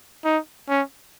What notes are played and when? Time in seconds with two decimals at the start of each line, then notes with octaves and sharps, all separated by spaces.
0.25 D#4
0.69 C#4